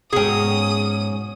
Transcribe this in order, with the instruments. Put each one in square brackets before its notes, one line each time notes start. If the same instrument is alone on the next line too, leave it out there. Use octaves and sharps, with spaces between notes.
[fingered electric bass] G#2 B2 [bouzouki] F#3 C#4 [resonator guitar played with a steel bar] G#4 G5 [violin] D#6